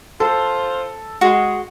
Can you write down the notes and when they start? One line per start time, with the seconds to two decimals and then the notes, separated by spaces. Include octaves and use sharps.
0.20 F4 A4 C5
1.21 G#3 F#4